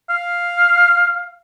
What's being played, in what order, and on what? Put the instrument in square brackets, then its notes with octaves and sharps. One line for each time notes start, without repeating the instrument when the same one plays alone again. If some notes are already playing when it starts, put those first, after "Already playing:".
[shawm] F5